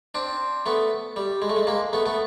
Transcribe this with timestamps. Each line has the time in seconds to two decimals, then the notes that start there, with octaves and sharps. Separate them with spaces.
0.15 C4 D4
0.66 A3 B3
1.16 G3
1.42 G#3
1.50 A3
1.56 G#3
1.67 G#3 A#3
1.93 A3 B3
2.06 A3 B3